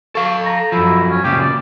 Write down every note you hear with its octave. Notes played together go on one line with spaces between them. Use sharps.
A4 F5 C#6
A#5
F#2 F3 E4
C#4
A#2 C#3 G4
D5